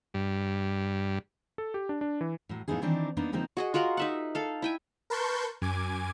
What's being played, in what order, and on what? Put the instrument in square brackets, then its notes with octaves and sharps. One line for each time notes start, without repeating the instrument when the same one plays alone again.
[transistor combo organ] G2
[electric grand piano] A4
G4
D4
D4
E3
[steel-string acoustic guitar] A2 F#3
A2 F3 B3 D#4 E4 G#4
D#3 E3 C4 D4 D#4 D5
A#3 B3 D4 D#4
D3 F3 A#3 C4 D#4
[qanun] F#4 G#4 D#5
F4 F#4 A#4 F#5
D#4 E5 F#5
A4 F5
E4 G5 G#5
[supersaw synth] A#4 B4 A5 C6 C#6 G6
F#2 G#5 D6 G#6